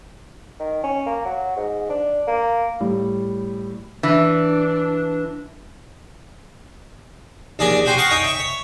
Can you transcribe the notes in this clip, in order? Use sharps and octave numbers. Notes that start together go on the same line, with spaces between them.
D#3
C#4
A#3
F#3
G#2
D4
A#3
A2 G3
E3 D4
A#1 D#2 D4 D5 D#5 G#5
F#4 G4 C5 G5 G#5
F5 F#5 A#5 C#6 D#6
D#4 C#5 D#5 G5 G#5
E5 C#6
C#5